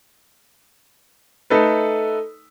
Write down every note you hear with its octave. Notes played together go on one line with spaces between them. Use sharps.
A3 D#4 A4 B4